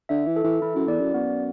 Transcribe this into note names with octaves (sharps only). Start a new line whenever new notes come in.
D3 E5
E3
A4
E3
E3 E4
F#2
E2 D5
F#2
F#2 B3